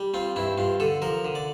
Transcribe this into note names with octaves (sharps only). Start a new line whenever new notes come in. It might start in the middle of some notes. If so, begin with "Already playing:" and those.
Already playing: G3
C4 F4
G2 E4
G2 F4
D3 A4
F3 A#4
D3
D5